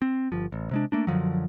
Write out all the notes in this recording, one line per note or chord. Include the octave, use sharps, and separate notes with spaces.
C4
G1 F3
A1
C3 G#3 D4
A3 A#3 D4
F#2 D3 F3 F#3